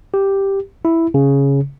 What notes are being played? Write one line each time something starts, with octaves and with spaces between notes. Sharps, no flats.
G4
E4
C#3